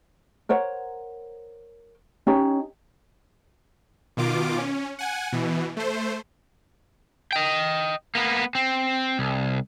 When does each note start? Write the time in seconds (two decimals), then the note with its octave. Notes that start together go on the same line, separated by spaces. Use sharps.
0.49 A#4 C5 C#5 F#5
2.27 C#4 D#4 G4 C#5
4.17 B2 D#3 F4 D6
4.58 C#4
4.99 F#5 G#5
5.32 B2 E3
5.77 A3 C5
7.33 D#5 G5
8.15 A#3 B3
8.55 C4
9.19 C2